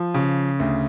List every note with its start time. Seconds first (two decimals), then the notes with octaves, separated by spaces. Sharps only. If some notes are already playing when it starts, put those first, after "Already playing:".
Already playing: F3
0.14 C#3
0.60 D2